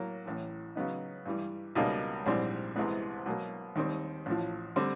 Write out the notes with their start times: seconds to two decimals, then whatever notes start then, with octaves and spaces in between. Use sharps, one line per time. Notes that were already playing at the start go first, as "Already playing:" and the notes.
Already playing: A2 F#3 A#3
0.26 A1 A2 E3
0.75 C#3 F#3 B3 D#4
1.25 G2 E3 G3
1.75 C#2 B2 G3 A#3 D#4
2.26 A#1 G#2 E3 G3 C4
2.76 C2 C3 E3 G#3 B3
3.26 B2 F#3 A#3
3.76 D#2 D#3 G3 C4
4.26 A1 A2 F3
4.76 D3 G3 C4